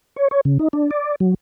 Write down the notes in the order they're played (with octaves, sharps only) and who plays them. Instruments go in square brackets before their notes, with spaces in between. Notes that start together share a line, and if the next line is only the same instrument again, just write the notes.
[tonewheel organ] C#5
C#5
C#3
D#4
D4
D5
F#3